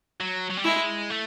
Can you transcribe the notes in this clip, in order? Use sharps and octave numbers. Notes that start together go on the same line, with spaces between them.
F#3
F#3
G3
G#3 E4
A3